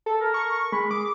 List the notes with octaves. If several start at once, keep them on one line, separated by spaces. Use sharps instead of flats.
A4
A#4
C#6
G#3 B5
G#4 D6